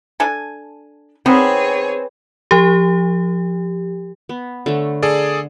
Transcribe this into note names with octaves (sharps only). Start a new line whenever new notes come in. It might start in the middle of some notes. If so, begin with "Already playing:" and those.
D4 A4 G#5
D#3 B3 C4 G#4 B4 C#5
F3 G4
B3
D3 A3 C#5
G#4 A4 D5